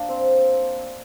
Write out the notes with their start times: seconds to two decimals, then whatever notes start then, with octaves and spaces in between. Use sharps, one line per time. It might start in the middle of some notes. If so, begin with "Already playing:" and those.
Already playing: A#3 D4
0.09 C4